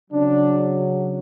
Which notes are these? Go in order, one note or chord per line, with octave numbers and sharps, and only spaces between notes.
C#3 F#3 D4